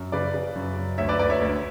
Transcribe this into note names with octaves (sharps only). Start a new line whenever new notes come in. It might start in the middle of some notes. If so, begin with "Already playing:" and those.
Already playing: F#2
C#3 B4 D5
C#3
F#2
F#2
D2 C#5 E5
B4 D5
D2 B4 D5
C#5 E5
D2